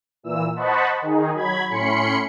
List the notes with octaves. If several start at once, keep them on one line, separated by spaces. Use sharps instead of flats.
A#2 E3 E6
C5 D#5 F#5 A5 B5 C#6
D#3 D#4 G#4
F#3 B5 G#6
A2 C#4 B5 C6 C#7